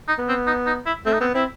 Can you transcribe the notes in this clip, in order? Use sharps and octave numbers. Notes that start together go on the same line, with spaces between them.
D#4
B3
C4
D#4
D#4
E4
A3 C4
D#4
B3 C4
C4 E4